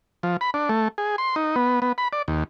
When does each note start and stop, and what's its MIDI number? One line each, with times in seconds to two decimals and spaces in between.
0.23 0.37 53
0.41 0.50 83
0.54 0.69 62
0.69 0.88 57
0.98 1.16 68
1.18 1.35 84
1.36 1.56 63
1.56 1.80 59
1.82 1.92 59
1.98 2.08 83
2.13 2.22 74
2.28 2.43 39